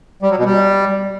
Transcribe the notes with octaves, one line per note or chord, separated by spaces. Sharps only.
G3
F#3
B2
G3